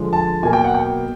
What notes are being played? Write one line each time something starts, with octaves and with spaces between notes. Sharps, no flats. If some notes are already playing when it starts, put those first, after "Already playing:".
Already playing: D3 F3 G#3
A5
B2 F#3 A#3 G#5
G5
F#5
G5